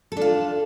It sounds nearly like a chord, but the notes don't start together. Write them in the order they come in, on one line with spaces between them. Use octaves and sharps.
A4 D4 F4